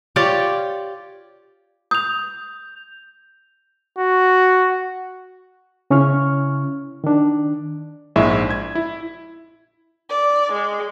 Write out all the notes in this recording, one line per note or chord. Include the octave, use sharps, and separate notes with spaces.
F4 G4 C#5 D5
D#6 G6 F7
F#4
C#3 C#4 E4 C#6 F6
D#3 D4
A#1 G#2 G#3 E4 E5 C#6
G#6
E4
D5
G#3